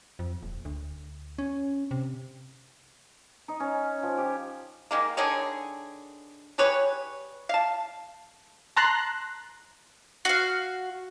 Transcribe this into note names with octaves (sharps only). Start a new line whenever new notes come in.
F2
D#1
D2
C#4
C3
D#4
C#4
F3
G4
D#3 G#3 A#3
D3 D#3 G#4 C#5
G3 G#4 B4 C#5
F5 A5
A5 A#5 C6 F#6
F#4 F5